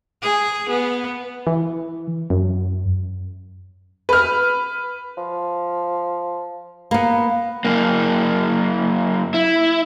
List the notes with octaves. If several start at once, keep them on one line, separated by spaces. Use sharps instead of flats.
G#4
B3
E3
F#2
B4 F6
F3
A#3 B3 B4
F#2 A#3
E4